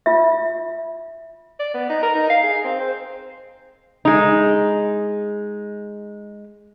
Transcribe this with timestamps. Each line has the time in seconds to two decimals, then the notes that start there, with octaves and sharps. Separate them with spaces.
0.06 F4 E5
1.60 D5
1.74 B3
1.90 D#4
2.03 A#4
2.15 D#4
2.30 F5
2.43 G#4
2.64 C4
2.80 C5
4.05 G#3 D#4